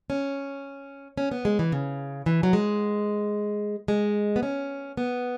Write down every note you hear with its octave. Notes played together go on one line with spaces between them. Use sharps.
C#4
C#4
B3
G#3
E3
C#3
E3
F#3
G#3
G#3
B3
C#4
B3